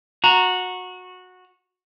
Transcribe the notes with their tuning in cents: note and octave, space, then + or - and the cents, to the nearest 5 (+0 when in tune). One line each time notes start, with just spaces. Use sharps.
F#4 -15 A#5 +0